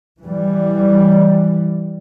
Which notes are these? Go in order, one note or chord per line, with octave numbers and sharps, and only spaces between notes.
E3 G3